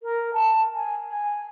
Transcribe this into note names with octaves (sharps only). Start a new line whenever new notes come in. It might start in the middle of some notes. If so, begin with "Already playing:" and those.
A#4
A5
G#5
G#5